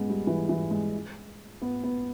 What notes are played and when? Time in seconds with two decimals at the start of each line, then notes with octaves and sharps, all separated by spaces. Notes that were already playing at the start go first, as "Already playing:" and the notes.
Already playing: G#3 B3 C#4
0.09 G3
0.27 E3
0.49 E3
0.71 G#3
1.62 B3
1.84 B3